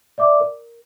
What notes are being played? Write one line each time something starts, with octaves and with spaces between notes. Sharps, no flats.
D5 E5 D6
A#4